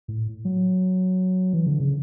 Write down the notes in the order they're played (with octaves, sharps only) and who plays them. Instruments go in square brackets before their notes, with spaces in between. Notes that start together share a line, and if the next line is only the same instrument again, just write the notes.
[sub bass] A2
F#3
E3
D3
C#3